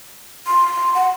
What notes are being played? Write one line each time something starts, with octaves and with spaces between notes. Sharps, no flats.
C6
F#5